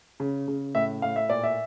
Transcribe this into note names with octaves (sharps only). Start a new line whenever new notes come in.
C#3
C#3
A2 E5
A2 F5
E5
A#2 D5
E5